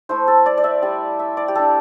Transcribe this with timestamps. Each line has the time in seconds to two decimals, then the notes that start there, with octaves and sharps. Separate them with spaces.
0.09 A3 E4 C5
0.28 A4
0.46 D5
0.57 D5
0.64 E5
0.82 G3 E4
1.19 E5
1.37 D5
1.48 G4
1.55 G3 D4 A4